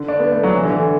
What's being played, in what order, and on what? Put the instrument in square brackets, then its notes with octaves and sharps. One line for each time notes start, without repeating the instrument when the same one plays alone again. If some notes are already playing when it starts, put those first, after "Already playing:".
Already playing: [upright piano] D3
D4
B3
A3
F#3
E3
D3
E3